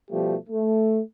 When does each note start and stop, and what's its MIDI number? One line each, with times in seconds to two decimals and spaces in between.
0.11 0.36 47
0.11 0.36 53
0.11 0.36 55
0.11 0.36 57
0.11 0.36 67
0.49 1.00 57